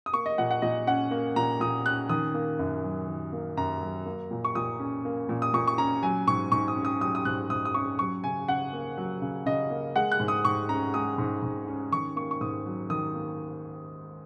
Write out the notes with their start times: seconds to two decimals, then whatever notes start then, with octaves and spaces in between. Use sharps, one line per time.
0.06 D#6
0.13 A#3 C#6
0.26 D#5
0.38 A#2 F#5
0.51 F#5
0.62 A#2 D#5
0.87 C#4 F#5
1.11 A#3
1.36 A#2 A#5
1.60 A#2 D#6
1.85 C#4 F#6
2.09 D#3 D#6
2.34 A#3
2.59 F#2
2.84 F#3
3.08 D#3
3.33 A#3
3.57 F#2 A#5
3.82 F#3
4.06 A#3
4.31 A#2
4.44 C#6
4.55 A#2 D#6
4.80 C#4
5.05 A#3
5.29 A#2
5.42 D#6
5.54 A#2 C#6
5.68 C#6
5.78 C#4 A#5
6.03 F#3 G#5
6.27 G#2 C#6
6.52 G#2 C#6
6.68 D#6
6.76 C#4
6.85 D#6
7.01 F#3 D#6
7.15 D#6
7.25 G#2 F#6
7.50 G#2 D#6
7.65 D#6
7.74 C#4 C#6
7.99 F#3 C#6
8.24 C#3 G#5
8.48 C#3 F#5
8.73 A#3
8.98 F#3
9.22 C#3
9.46 C#3 D#5
9.70 A#3
9.95 G#3 F#5
10.12 F#6
10.20 G#2
10.28 D#6
10.45 G#2 C#6
10.69 C#4 A#5
10.94 G#3 D#6
11.18 G#2
11.43 G#2
11.68 C#4
11.92 D#3 C#6
12.16 A#3 C#6
12.31 C#6
12.41 G#2 D#6
12.66 F#3
12.90 D#3 D#6
13.15 A#3